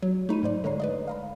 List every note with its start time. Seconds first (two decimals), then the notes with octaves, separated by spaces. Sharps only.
0.02 F#3
0.29 A3 D#4 B5 D#7
0.43 G#2 C5 D5
0.64 D3 G#3 C#5 A#5 C7
0.80 B4 D5 D#5
1.07 F5 A#5 B5